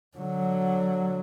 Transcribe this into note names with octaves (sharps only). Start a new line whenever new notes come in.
D3 F#3